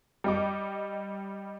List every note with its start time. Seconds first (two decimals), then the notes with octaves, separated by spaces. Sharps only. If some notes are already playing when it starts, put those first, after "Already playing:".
0.24 G3 D#5 D6